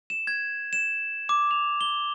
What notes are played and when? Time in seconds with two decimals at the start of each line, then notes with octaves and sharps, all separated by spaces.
0.10 E7
0.27 G#6
0.73 E7
1.29 D6
1.51 F7
1.81 G7